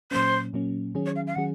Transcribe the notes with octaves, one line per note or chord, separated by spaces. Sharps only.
A#2 F#3 A#3 C#4 C5
A#2 F#3 A#3 C#4
D#3 F#3 C#4 G#4
C#5
F5
F5
D#3 F#3 C#4 G#4 F#5